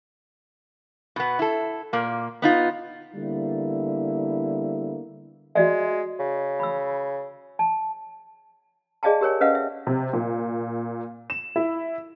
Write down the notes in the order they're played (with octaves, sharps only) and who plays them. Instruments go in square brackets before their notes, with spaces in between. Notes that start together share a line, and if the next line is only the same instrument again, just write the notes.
[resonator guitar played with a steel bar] B2 B3
E4 A4
A#2 A#3
B3 D#4 F4
[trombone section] D3 G3 A#3 B3 E4
[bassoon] G#3 [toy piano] F#4 D5 E5
[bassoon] C#3
[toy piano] B5 E6
A5
G#4 D5 D#5 F5 G#5 A5
G4 A#4 C#5 G#5
C#4 B4 D#5 F5 F#5
E5
[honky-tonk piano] C3
A#2
E7
E4